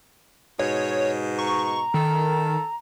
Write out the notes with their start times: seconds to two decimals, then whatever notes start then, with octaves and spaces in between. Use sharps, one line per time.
0.59 G#2 B2 C#5
1.39 A#5 C#6
1.94 D#3 A4